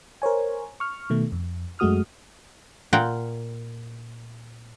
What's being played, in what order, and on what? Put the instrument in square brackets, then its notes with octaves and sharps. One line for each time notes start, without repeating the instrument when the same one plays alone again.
[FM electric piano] A#4 C5 C#5 G#5
C#6 F6
B2 D#3 A3
F2
F#2 G#3 A3 F#4 D#6 F6
[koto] A#2 F4 A#4 F#5 G5